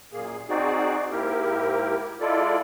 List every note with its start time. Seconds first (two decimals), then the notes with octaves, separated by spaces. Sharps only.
0.12 F#2 A#2 A#3 G#4
0.49 C4 D#4 F#4 G#4 D5
1.11 G#2 A#3 E4 G4 A#4
2.20 G#3 E4 F4 A4 D5